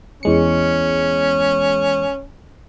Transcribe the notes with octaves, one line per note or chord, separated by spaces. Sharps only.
E2 G#3 C#4 C#7